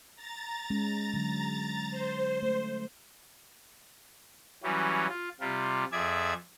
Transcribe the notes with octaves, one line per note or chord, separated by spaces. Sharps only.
A#5 A6
G#3 C#4
D3 F#3
C5
A3
E3 F#3 G3 C#4
F4
C3 G3 F4
F2 G#4 D5 E5 G#6